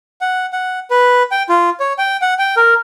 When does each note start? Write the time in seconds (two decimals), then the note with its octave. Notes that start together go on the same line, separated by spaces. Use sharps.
0.21 F#5
0.53 F#5
0.91 B4
1.31 G5
1.49 F4
1.80 C#5
1.98 G5
2.22 F#5
2.39 G5
2.57 A#4